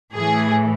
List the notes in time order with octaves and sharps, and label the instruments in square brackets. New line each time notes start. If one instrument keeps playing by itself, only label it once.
[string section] A2 E3 G#4